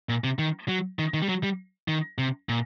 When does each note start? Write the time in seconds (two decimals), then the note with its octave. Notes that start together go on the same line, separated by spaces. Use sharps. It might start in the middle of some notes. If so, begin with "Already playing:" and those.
0.09 A#2
0.24 C3
0.39 D#3
0.68 F#3
0.99 D#3
1.14 D#3
1.22 G3
1.29 F#3
1.43 G3
1.88 D#3
2.18 C3
2.49 A#2